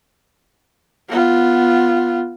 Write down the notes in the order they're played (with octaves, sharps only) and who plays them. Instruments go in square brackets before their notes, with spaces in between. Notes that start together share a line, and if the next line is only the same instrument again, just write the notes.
[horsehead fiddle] B3 F4